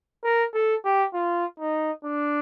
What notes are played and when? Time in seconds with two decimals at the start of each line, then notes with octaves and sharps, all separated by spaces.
0.24 A#4
0.54 A4
0.85 G4
1.14 F4
1.60 D#4
2.05 D4